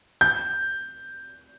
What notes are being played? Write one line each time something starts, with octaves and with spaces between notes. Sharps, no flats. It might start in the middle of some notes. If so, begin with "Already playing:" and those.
G6